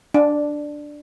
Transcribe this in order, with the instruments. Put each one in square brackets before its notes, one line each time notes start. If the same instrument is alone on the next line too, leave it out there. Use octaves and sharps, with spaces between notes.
[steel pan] D4